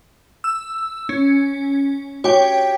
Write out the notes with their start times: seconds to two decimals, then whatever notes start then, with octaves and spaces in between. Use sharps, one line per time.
0.44 E6
1.09 C#4
2.24 G4 C#5 G5